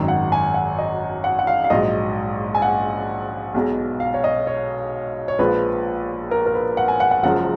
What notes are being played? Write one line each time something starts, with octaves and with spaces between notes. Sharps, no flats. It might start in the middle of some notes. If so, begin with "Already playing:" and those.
Already playing: G#1 F#2 D#3 F#3
F#5
G#5
F#5
D#5
F#5
F#5
F5
F5
A#1 G#2 F#3 D#5
G#5
F#5
B1 B2 G#3
F5
C#5
D#5
C#5
C#5
A#1 A#2 F3 G#3 B4
A#4
A#4
B4
F#5
G#5
F#5
F#5
F#1 F#2 F3 G#3 F#5